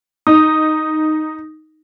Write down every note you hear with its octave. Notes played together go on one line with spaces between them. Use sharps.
D#4 D#6